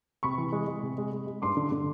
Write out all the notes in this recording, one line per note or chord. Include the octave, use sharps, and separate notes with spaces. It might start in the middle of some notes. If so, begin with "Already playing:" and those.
C3 B5 C#6
E3
G#3
G#3
C3
G#3
G#3
G#3
G2 C6 D6
D3
D3